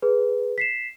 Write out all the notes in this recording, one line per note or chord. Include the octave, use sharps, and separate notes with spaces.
G#4 B4
B6 C7 E7